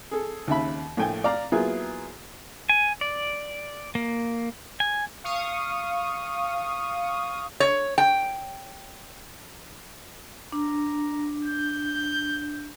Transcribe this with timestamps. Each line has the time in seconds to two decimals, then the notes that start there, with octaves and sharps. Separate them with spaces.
0.11 G#4 A4
0.48 D#2 C#3 E5 B5
0.97 A#1 A2 A3 G5 G#5
1.24 D5 F5 A#5
1.52 F#3 A#3 B3 E4 F4 G#4
2.69 G#5
3.01 D5
3.95 A#3
4.80 G#5
5.24 F5 C#6 D#6
7.60 C#5
7.98 G5
10.52 D4 A#5
11.44 G6